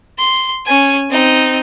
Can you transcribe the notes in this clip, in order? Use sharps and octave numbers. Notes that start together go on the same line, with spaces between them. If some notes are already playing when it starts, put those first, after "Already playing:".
C6
C#4 G#5
C4 D#4